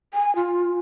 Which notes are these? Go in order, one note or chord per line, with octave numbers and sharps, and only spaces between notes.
G#5
F4